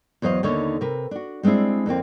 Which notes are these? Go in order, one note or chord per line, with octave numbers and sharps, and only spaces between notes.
E2 F#3 C5 D#5 F5
D#2 D3 D#4 C#5
C3 A#4 B4
D4 F#4
G3 G#3 C4 D4 E4
F2 D3 A#3 C4